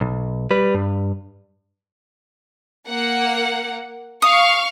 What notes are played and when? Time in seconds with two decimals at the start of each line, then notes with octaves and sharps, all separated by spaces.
0.01 B1
0.51 G3 B4
0.75 G2
2.90 A#3 F#5
4.22 F5 C#6 D#6